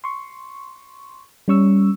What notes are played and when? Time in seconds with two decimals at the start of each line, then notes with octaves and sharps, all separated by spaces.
0.04 C6 C#6
1.48 G3 C#4 C#6 E6